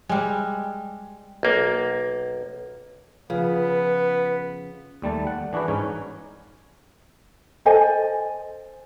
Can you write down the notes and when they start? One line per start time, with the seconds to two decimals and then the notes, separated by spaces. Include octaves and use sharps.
0.09 G3 G#3
1.43 B1 A#3
3.30 C#3 F3 B3 F4 B4
5.02 D#2 G3 A3 A5
5.27 F#5
5.53 E3 D4 F#4 G#4 B4
5.68 G#2 C#4 D#4 C#5
7.66 A4 C5 D#5 G#5